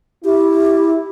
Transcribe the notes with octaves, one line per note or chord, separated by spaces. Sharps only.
E4 G4